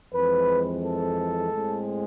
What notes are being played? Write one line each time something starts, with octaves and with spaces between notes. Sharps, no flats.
F2 E3 G#3 C4 B4
A4
A2 G#3 C4